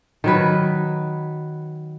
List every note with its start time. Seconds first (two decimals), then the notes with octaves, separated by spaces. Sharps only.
0.24 D#3 F#3 B4